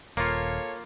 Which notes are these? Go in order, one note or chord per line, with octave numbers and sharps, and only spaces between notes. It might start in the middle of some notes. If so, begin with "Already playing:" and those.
D#1 A#3 F4 A4 C#5